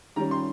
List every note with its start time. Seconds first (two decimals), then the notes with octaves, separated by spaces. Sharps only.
0.16 D#3 G3 C#4 A#5
0.31 C6